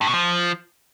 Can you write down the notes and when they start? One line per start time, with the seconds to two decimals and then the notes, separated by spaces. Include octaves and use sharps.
0.01 G2
0.07 B2
0.14 F3